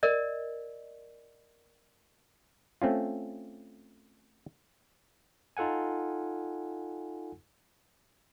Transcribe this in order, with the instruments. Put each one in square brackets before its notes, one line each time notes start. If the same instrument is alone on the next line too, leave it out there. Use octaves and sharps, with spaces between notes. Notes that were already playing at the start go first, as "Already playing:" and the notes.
[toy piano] A#4 D5 D#5
[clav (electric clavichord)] A3 C4 C#4 F4
[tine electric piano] D#4 F4 A4 F#5 G#5